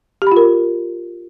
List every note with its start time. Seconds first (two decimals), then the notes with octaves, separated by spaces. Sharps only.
0.22 G4
0.27 B5
0.32 F4
0.37 A#4